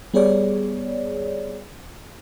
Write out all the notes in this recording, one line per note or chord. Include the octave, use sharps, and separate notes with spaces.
G3 B3 G#4 C#5 D5